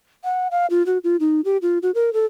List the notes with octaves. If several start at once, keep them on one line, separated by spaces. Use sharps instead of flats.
F#5
F5
F4
F#4
F4
D#4
G4
F4
F#4
A#4
A4